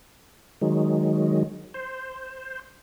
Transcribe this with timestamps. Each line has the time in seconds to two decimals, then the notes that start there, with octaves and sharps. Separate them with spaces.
0.61 D#3 F#3 G#3
1.74 C5